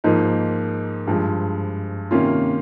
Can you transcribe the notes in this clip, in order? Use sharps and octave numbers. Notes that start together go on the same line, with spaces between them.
G#2 F3 A#3 D#4
G2 F3 G#3
C3 D#3 A#3 C#4 F4